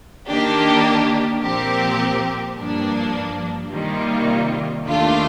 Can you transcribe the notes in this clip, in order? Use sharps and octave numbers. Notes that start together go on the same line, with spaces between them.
D#3 A#3 D4 G4
A#2 F3 C4 G4 A#4
G2 F3 A#3 D4
C3 D#3 G3 A#3 F4
D#2 D#3 A3 D4 F4